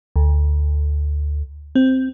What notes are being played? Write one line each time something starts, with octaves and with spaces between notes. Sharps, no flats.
D2
C4